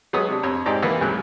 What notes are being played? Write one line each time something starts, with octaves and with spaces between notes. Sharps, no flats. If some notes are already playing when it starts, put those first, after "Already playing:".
F#3 G#3 B3 C#5 D#6
C3 D4
F2 C#5
G#2 C4 D#4 G4 D5 A#5
C3 E3 A#3 B3 E4
C#2 G#2 C3 F#3 F#6